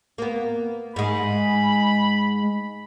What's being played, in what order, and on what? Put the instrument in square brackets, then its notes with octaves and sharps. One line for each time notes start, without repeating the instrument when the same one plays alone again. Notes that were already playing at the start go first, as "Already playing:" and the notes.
[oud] A#3 B3
[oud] G#2 G#3 [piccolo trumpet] B5